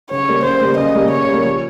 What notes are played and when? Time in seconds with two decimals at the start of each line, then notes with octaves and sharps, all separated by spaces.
0.11 C#3 C#5
0.28 G3 A#3
0.44 C#3 C5
0.61 G3 A#3
0.77 C#3 D#5
0.95 G3 A#3
1.11 C#3 C#5
1.28 G3
1.33 A#3
1.45 F3